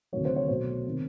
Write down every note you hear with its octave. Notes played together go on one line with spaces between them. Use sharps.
D2 C3 D#3 F#3 A3 C#5
C5
C#5
B1 B2 F#3 A3 C5
C3 D#3